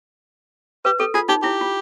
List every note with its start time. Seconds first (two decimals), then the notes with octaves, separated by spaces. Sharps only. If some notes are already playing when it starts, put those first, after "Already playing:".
0.85 G4 B4
1.00 G4 A4
1.14 F4 G#4
1.29 D#4 G4
1.43 E4 G4
1.61 F4